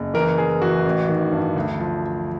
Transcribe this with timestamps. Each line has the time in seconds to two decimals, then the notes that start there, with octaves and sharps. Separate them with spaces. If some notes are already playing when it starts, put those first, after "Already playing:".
Already playing: F#1
0.14 E3 A#4
0.38 E3 G#4
0.61 E3 F#4
0.85 A1
1.09 D#3
1.32 G2
1.56 D2
1.80 F3